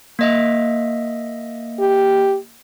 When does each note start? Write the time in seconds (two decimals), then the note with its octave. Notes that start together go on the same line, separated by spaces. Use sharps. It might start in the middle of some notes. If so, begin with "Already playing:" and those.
0.19 A#3 D#5 E5
1.80 G4